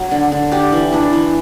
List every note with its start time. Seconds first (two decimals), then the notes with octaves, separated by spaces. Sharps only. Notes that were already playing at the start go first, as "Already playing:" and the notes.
Already playing: F#3
0.11 D3
0.32 D3
0.51 D4 G4
0.72 E3
0.93 D4 E4
1.13 E3